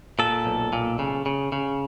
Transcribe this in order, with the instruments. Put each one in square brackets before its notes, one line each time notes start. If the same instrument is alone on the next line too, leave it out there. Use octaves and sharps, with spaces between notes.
[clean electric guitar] A#2 A4
B1
A#2
C#3
C#3
C#3